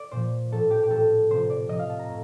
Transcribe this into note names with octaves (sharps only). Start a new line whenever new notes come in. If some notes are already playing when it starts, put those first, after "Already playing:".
Already playing: D5
A#2 F3 C5
A2 F3 A4
G4
G4
A2 F3 A4
C3 F3 C5
D5
C3 F3 D#5
F5
A5
A#5
A2